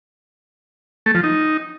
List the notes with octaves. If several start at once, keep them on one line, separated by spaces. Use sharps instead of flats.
A3
F3
D#4